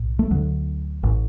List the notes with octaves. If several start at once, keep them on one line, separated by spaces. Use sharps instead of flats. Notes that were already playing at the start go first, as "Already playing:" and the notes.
Already playing: B1 A2
A3
D2 D3 F#3
A1 A2